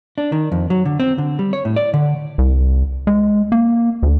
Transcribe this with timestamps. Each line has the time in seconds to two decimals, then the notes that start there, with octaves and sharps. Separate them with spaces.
0.18 D4
0.32 D#3
0.52 F2
0.70 F#3
0.86 D3
1.00 C4
1.18 D3
1.39 G3
1.53 C#5
1.65 A2
1.76 D5
1.94 D3
2.38 C2
3.07 G#3
3.52 A#3
4.03 D2